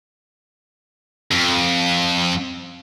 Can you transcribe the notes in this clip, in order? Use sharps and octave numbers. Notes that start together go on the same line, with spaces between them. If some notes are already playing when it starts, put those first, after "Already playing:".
F2